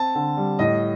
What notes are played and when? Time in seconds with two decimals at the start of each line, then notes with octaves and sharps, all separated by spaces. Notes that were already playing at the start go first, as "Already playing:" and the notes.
Already playing: C4 A5
0.15 D3
0.37 G3
0.59 A2 D#5